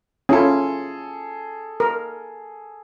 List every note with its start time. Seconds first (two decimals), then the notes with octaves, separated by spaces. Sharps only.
0.29 C#4 E4 F4 G#4 A4
1.80 A#4